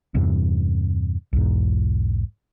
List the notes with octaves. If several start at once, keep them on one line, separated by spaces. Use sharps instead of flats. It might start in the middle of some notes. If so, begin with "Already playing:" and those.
E2 G2 C3
B1 E2 G#2